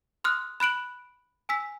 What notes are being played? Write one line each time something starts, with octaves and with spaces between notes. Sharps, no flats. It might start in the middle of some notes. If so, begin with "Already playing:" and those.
C6 D#6 F6 F#6
B5 F#6 D7 F#7
G#5 E6 B6